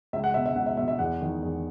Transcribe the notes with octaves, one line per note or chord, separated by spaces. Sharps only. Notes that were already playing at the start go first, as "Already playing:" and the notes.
C#2 E5
F#5
B2 E5
E5
C#2 F#5
E5
B2 E5
E5
E2 F#5
D#3
E2